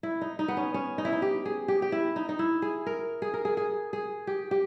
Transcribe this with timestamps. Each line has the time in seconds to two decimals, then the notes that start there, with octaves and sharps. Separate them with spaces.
0.03 E4
0.21 D#4
0.39 D#4
0.48 B3
0.57 C#4
0.74 C#4
0.98 D#4
1.05 E4
1.12 D#4
1.22 G4
1.45 G#4
1.68 G4
1.82 G4
1.92 E4
2.16 D#4
2.29 D#4
2.39 E4
2.62 G#4
2.86 A#4
3.22 G#4
3.34 A#4
3.45 G#4
3.57 G#4
3.93 G#4
4.27 G4
4.51 G4